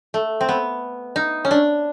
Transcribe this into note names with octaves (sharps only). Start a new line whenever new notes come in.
A3
C4
B3
D#4
C#4
D4